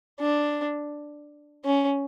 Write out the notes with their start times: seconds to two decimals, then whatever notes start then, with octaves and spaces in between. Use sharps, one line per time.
0.20 D4
1.65 C#4